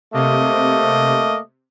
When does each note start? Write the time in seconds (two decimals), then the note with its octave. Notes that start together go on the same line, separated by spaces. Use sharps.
0.14 C3 A3 A#3 D#5